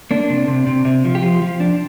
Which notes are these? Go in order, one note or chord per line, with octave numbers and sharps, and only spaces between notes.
A#3 D4
C3
C3
C3
C3
F3
G4
F3 F4
F3
D4